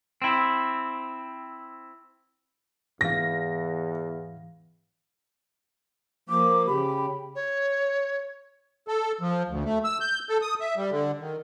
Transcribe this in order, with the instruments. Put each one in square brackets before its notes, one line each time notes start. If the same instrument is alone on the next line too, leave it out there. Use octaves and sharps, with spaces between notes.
[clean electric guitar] C4 E4
[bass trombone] E2 [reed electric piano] G#2 E3 F5 [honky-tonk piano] A#6
[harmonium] F3 A#3 [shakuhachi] D6
[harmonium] C#3 G4 [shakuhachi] B5
[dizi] C#5
[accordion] A4
F3
D2
A3
E6
G6
A4
D#6
E5
G3
D3
D#3